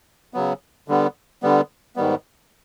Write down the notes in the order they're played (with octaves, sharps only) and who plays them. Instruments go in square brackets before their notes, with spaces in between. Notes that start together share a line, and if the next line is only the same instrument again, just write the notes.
[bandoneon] C#3 F#3 B3
D3 G3 B3
D3 G3 B3
G#2 D#3 G3 B3